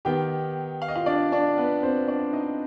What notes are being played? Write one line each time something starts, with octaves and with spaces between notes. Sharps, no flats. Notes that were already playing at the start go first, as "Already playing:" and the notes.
D#3 B3 G4 G5
F5
D#5
F4 F5
D4 D5
D4 D5
B3 B4
C4 C5
D4 D5
D#4 D#5